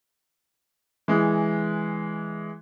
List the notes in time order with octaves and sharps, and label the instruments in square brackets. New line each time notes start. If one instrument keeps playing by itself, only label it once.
[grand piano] E3 G#3